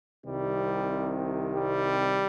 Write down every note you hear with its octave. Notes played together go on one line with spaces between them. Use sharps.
C2 C3 D#3 G3
G3